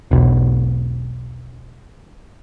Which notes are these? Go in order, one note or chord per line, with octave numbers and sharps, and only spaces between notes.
E1 B1